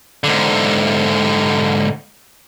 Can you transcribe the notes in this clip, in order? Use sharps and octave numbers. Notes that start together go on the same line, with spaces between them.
G#2 D3